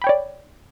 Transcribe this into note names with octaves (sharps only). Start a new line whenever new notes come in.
C#5 D5 G5 B5